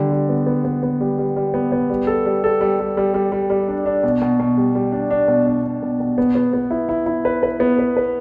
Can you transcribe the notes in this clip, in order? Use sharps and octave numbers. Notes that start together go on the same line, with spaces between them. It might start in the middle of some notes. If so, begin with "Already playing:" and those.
Already playing: D3 G3
G3
B3
B3
B3
B3
G3
G3
G3
B3
B3
G3
A4
G3
A4
G3
G3
G3
G3
G3
G3
D4
D4
B2
B2
B2
G3
G3
D4
D4
B2
D4
D4
B2
B2
B3
B3
B3
E4
E4
E4
B4
B4
B3
B4
B4